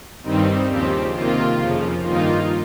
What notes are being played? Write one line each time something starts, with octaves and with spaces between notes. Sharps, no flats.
G2 D#3 G3 C4 D#4
D#2 C#3 F3 C4 G4
C3 D#3 A#3 F4
F2 C#3 F3
G2 D#3 A#3 D#4 F4